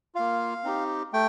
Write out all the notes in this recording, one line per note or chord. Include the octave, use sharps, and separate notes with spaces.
A#3 F4 F5
C4 D#4 G4
A3 G5